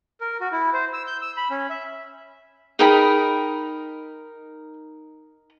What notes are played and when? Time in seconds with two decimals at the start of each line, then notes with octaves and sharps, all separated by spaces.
0.21 A#4
0.41 F#4
0.52 E4
0.73 C5
0.93 E6
1.07 G6
1.22 E6
1.37 B5
1.50 C#4
1.70 E5
2.79 D#4 G#4 A#4 G5 B5